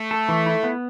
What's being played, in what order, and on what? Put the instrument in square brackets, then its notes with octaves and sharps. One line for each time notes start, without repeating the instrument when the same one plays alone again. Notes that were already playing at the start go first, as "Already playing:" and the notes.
Already playing: [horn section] A3
[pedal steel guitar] A4
E3
E4
B3